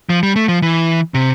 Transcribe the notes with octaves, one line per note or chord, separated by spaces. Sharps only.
F3
G3
A3
F3
E3
C3